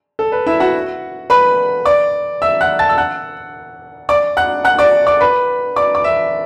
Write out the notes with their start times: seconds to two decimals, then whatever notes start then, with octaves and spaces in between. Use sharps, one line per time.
0.19 A4
0.32 B4
0.46 E4 E5
0.60 F#4 F#5
1.30 B4 B5
1.86 D5 D6
2.42 E5 E6
2.61 F#5 F#6
2.79 A5 A6
2.89 E6
2.98 F#5 F#6
4.09 D5 D6
4.37 F#5 F#6
4.65 F#5 F#6
4.79 D5 D6
5.07 D5 D6
5.21 B4 B5
5.76 D5 D6
5.95 D6
6.04 E5 E6